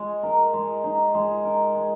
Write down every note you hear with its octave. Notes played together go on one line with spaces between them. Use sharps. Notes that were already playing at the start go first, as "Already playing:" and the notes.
Already playing: G#3
A#4
G#3
D#4
G#3
A#4
G#3